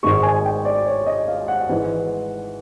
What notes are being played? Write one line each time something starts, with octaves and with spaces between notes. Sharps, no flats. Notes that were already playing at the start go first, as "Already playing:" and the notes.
G#1 G#2 D#3 G#3 C#6
G#5
G5
D5
C#5
D#5
F5
F#5
G#1 G#2 E3